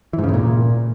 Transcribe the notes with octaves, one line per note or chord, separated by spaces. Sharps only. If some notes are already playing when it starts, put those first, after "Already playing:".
E3
G#2
C#3
A2
A#2